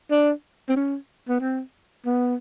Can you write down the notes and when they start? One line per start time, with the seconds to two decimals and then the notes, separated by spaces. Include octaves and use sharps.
0.11 D4
0.69 C4
0.76 C#4
1.29 B3
1.40 C4
2.05 B3